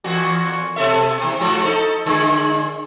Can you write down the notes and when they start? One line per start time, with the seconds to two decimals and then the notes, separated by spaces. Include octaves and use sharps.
0.04 E2 A#2 F#4
0.76 B2 A4 E5
1.18 D#2 C3
1.40 G#2 F3 F#4
1.65 D#4 A4
2.06 A#2 D3 G#3